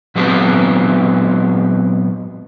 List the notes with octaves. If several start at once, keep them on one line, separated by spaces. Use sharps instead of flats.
A#2 F#3 G#3 B3 C4 F#4